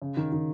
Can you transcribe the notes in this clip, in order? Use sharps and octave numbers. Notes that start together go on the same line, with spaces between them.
C#3
D#3
D#3